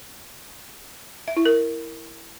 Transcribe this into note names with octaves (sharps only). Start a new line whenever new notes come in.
E5
E4
A#4